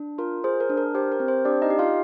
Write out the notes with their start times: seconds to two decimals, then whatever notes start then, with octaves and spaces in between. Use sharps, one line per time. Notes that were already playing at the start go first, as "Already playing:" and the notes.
Already playing: D4
0.18 F4 A#4
0.44 G#4 C5
0.60 A#4
0.70 D4
0.77 A#4
0.95 G4 C5
1.12 A#4
1.20 C4
1.28 C5
1.45 D4 G4 D5
1.62 D#4 D#5
1.70 G4
1.79 F4 F5